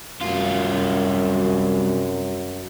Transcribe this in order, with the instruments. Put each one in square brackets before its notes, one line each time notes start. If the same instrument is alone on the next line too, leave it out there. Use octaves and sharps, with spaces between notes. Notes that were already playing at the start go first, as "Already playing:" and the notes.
[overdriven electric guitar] C2 F4 [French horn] F#2